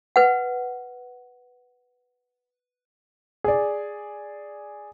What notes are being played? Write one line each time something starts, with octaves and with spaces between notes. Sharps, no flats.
B4 F#5
G#4 D5